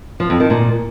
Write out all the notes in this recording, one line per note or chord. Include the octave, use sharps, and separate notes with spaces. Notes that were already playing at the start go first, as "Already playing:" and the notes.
F3
F2
D#3
A#2